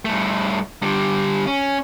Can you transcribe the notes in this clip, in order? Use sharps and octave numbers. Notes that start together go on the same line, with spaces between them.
G2 A3
D3 G3
C#4